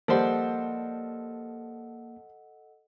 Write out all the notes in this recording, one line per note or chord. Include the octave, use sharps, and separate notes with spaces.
F3 G3 A#3 A4 C5 D#5 F#5